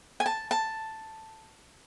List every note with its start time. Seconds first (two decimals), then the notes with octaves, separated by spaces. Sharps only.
0.20 G#5
0.26 A5
0.51 A5